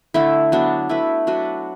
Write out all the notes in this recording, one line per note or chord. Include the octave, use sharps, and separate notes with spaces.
D3 A3 E4
F#3 B3 D4
A3 E4 B4
F#3 D4 F#4 B4